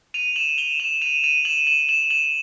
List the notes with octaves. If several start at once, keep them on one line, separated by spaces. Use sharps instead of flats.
D#7 F7
E7 F#7
F7 G7
E7 F#7
D#7 F7
D#7 F7
E7 F#7
E7 F#7
E7 F#7
E7 F#7